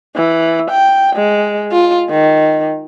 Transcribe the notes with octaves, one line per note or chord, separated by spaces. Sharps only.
E3
G5
G#3
F4
D#3